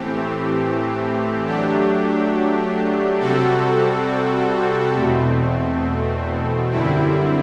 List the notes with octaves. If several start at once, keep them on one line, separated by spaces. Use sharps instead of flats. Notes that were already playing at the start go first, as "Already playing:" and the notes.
Already playing: A2 E3 A3 C4 G4
F#3 A3 D4 G4
C3 G3 C4 F#4 A4
E2 B2 A3 C4
F#2 D3 G3 C4 E4